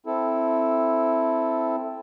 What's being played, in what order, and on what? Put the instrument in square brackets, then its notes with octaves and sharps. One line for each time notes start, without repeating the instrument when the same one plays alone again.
[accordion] C4 E4 A4